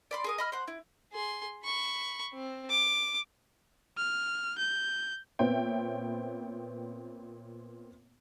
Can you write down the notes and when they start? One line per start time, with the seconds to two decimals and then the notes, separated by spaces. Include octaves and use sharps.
0.11 D5 B5 C6
0.24 G#4 A#4 D#6
0.38 D#5 B5 F6
0.52 C5 F#5
0.68 E4
1.13 G#4 C6
1.64 B5 C#6
2.34 C4
2.70 D6
3.97 F6
4.58 G6
5.39 A#2 B3 C4 C#5 E5 G5